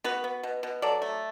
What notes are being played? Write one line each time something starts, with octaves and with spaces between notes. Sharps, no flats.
B3 F#4 B4
B3
B2
B2
F#3 A4 D5
A3